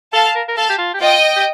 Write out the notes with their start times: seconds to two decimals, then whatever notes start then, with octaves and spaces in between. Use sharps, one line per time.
0.13 A4 F5 A5
0.35 A#4
0.49 A#4
0.57 A4 F5 A5
0.69 G4
0.78 F4
0.94 G4
1.01 F4 D#5 G5
1.36 G4